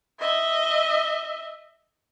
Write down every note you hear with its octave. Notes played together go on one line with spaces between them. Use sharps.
D#5 E5